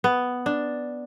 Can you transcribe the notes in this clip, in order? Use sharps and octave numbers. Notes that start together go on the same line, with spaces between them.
B3
D4